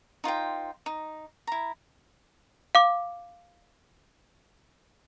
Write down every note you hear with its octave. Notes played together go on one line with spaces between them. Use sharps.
D#4 F4 C5 G5
D#4
E4 A#5
F5 D6